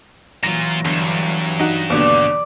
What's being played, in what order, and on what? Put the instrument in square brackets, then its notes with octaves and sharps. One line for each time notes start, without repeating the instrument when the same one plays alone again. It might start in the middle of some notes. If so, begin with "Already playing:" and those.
[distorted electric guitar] A#2 F4 [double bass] E3 F#3 [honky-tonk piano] A#6
[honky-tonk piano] G1 [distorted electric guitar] G2
[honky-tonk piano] D#4 F#4
[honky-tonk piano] D#2 B2 D3 [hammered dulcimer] D5 D6